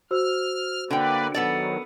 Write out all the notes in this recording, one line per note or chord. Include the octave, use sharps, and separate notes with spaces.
F#4 C5 E6 F6
D3 A#3 B4 D5 G5
D#3 F#3 B3 A4 D5